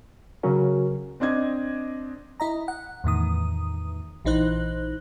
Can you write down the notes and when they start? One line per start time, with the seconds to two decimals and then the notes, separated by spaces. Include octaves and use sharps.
0.43 C#3 F#3 C#4 F#4 A#4
1.20 C4 D4 D#5 G#6
2.40 E4 D#5 A#5
2.68 F#5
3.04 E2 A2 D#3 D#6
4.25 A#1 E3 D#4 C5 F#6